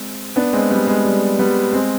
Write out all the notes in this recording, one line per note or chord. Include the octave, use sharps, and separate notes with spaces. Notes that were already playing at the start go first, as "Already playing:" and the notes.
Already playing: G#3 C4
B3 D4
G#3 C4
G3 B3
G#3
G3
G3 B3
G#3 C4